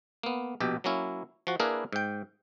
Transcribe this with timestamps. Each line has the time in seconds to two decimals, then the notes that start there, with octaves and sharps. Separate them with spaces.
0.23 A#3 B3
0.60 A#1 B2 G4
0.84 F#3 A#3 C#4 E4
1.47 F3 F#4
1.60 A#3 D4 E4 G#4 A#4 B4
1.93 G#2 G5